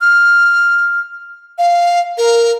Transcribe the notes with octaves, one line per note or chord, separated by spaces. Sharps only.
F6
F5
A#4